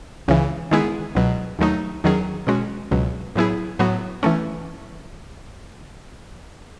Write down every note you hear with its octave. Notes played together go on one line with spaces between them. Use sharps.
C#2 C#3 E3
D#3 G#3 B3 E4 G#4
C#2 B2 F#3
D#2 D#3 F#3 A3 D#4
E2 D#3 F#3 C#4 G#4
B2 G#3 C#4 F#4
C#2 B2 F#3
A2 F#3 B3 E4 G#4
A2 F#3 B3 F#4
E3 A3 C#4